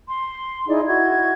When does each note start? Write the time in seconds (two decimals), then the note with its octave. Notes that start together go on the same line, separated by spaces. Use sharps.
0.08 C6
0.67 D#4 E4 G#4 D5
0.86 E4 F#4 G#6